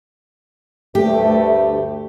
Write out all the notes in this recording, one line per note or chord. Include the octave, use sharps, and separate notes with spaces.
D2 G2 A3 G4